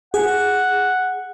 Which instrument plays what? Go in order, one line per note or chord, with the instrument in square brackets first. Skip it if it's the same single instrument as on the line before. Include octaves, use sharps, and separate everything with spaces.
[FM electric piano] G#4 [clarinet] F#5